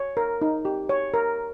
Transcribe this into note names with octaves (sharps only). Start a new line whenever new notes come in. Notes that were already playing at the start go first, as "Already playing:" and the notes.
Already playing: C#5
A#4
D#4
G4
C#5
A#4